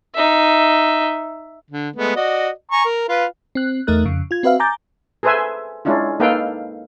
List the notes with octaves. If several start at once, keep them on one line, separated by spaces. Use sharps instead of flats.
D#4 E5
D3
G#3 A3 B3
F#4 D5 D#5
G#5 A#5 C#6
A#4
F4 B4 F5
C4 F#6
E2 A3 D#4 A#4 F#6
F2 C#3
F4 G#6
C4 F#4 B4 E5 F5
G#5 A#5 D6 G6 A6
G#4 A4 B4 C5 E5 G#5
G#3 C#4 D4 E4 F4
A#3 D#4 A4 B4 F5 G5